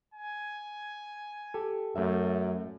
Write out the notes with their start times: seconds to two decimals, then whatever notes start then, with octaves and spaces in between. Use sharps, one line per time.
0.14 G#5
1.54 G4 A4
1.96 F#2 A3 E5